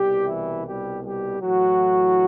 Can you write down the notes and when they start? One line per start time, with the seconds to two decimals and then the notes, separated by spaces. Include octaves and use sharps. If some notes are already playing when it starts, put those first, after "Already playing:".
Already playing: C2 B2 G3 G4
0.27 E3 E4
0.65 G3 G4
1.03 G3 G4
1.41 A2 E3 F#3 A3 F#4